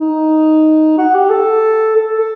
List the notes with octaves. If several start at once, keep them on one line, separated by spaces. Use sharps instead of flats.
D#4
F#4
G4
A4
A4
A4